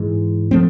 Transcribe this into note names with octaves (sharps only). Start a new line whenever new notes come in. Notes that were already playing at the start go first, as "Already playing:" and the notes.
Already playing: G#2 E3 G#3
F3 A3 C4